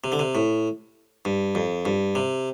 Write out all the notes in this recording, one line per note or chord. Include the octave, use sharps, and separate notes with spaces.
C3
D3
C3
A2
G2
F2
G2
C3